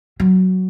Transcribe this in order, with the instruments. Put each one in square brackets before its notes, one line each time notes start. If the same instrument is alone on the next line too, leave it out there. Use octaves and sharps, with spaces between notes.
[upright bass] F#3